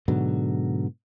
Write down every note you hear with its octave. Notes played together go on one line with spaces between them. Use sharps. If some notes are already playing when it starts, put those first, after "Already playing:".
G#2 B2 D3 F#3